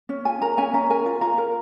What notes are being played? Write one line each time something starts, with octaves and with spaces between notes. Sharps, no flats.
C#4
F4 G#5
A#4 A#5
C#4 G#5
C#4 A#5
A#4 G#5
F4
F4 A#5
A#4